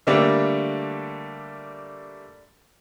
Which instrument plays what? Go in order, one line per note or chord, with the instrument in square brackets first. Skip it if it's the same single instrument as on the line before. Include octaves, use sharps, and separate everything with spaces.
[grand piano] D3 G3 A3 A#3 D4